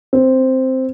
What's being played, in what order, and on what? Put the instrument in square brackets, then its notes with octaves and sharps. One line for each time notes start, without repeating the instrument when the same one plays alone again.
[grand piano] C4